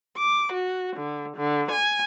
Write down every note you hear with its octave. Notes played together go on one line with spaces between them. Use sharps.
D6
F#4
D3
D3
G#5